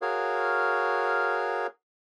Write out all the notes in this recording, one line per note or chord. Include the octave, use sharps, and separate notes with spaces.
F#4 G#4 A#4 C#5 F5